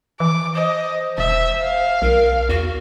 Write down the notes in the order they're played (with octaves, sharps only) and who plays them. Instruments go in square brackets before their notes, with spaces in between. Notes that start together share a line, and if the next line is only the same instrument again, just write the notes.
[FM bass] E3 [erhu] D6
[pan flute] C5 [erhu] D#5
[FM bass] E1 [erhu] E5
[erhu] F5
[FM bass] B1 [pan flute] A#4
[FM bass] E2 [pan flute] F#4